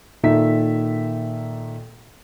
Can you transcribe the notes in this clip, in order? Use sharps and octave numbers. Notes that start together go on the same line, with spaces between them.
A#2 D#3 D#4 A4 E5 B6